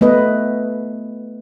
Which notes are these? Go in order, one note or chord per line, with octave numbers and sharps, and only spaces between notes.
A3 B3 B4 D#5